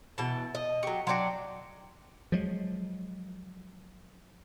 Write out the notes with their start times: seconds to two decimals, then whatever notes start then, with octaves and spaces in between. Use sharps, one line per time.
0.18 B2 E3 A5
0.55 D#5
0.83 F#3 G4 C#6
1.07 F#3 D4 F#4 G5 C6
2.32 F3 F#3 G#3